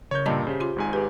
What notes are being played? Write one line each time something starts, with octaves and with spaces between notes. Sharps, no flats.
C#3 A#4 C#5 G6
G2 A#2 G3 D#5 A5 A#5
C#3 G4 C5
F4 C6
G#1 G#2 G#5
G4 G#4 B4